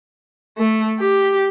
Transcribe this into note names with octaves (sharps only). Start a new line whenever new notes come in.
A3
G4